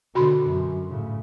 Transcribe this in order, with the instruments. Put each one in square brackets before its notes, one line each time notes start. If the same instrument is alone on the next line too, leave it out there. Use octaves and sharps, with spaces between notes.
[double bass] B2 D3 [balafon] F#4 B5 C6
[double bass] F#2
A2 C#3